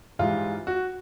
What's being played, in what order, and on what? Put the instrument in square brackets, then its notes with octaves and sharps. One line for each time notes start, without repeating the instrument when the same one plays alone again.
[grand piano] G#2 E3 G3 F4
F#4